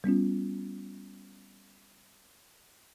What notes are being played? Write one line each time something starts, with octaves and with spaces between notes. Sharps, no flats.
G3 B3 C#4 F4